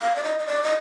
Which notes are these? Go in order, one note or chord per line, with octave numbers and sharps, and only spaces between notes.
F5
D5
D#5
D#5
D5
D#5